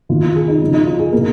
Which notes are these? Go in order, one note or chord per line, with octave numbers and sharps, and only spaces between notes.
D#3 A#3 F4
F4
G#4
D#4
C#3 F3 G#3 D#4
D#4
F4
G#4
A#2 A#3 A#4